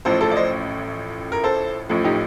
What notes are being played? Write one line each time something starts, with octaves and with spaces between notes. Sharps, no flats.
A1 A2 F3 A4 C5
A4 C5
D5
C5 D#5
A#4
A4 C5
A1 A2 F3
D#4 G4